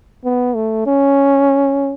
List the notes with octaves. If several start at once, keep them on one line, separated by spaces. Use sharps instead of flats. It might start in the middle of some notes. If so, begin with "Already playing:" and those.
B3
A3
C#4